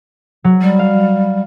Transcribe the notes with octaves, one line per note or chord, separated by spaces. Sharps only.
F#3
G3
F5